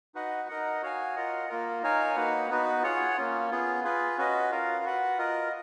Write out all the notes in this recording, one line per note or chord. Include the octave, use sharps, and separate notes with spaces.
D#4 F#4 B4 D#5 F#5
D#4 A#4 D#5 F#5
F#4 C#5 F5 G#5
F4 A#4 D#5 F#5
A#3 F4 A#4
D#4 A#4 C#5 F5 G#5
A#3 D#4 F#4 B4 F#5
B3 D#4 F#4 B4
F4 G#4 C#5 F#5
A#3 C#4 F4
B3 F4 G#4
F4 G#4 B4
C#4 F#4 B4 D#5
F4 A#4 F5
F#4 B4 F#5
F4 A#4 D#5